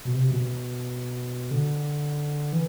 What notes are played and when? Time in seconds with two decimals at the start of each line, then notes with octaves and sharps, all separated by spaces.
0.05 B2
0.14 C3
0.31 B2
1.51 D3
2.52 E3